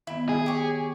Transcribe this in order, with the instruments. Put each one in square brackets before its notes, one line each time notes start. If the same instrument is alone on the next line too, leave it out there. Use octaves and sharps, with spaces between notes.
[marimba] D#3 B3 [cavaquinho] E4
[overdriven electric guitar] G#4
[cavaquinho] G4 C#5